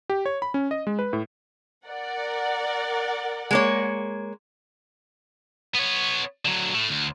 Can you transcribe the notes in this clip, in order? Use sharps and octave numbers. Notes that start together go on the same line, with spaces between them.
G4
C#5
B5
C#4
D#5
G#3
B4
A2
A#4 D5 F#5
G#3 A#3 C#5
B3 C#5
D3 F#3
A2 A3
D2